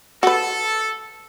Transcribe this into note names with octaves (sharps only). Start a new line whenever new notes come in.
F#4 A4 B4